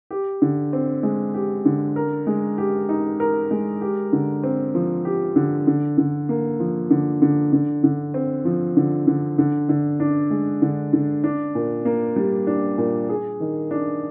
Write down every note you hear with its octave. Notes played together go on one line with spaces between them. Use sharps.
G4
D3
C4
G#3
G4
D3
A#4
G#3
G4
D#4
A#4
G#3
G4
D3
C4
F3
G4
D3
D3
D3
A#3
F3
D3
D3
D3
D3
C4
F3
D3
D3
D3
D3
D4
G#3
D3
D3
D4
A#2
A#3
G3
D4
A#2
G#4
D#3
D4